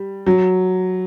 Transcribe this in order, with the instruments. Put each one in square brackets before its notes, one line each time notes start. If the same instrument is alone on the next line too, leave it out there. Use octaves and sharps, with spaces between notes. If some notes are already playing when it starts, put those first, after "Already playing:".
Already playing: [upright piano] G3
F#3